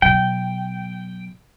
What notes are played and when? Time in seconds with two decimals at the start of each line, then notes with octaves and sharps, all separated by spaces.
0.02 B2 F#3 G5